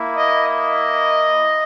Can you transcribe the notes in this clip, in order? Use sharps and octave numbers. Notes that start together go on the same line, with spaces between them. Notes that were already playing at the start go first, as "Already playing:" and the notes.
Already playing: A#3 E4
D#5
D#5